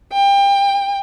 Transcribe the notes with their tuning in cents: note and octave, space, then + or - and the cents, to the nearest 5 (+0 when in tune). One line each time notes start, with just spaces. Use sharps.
G5 +25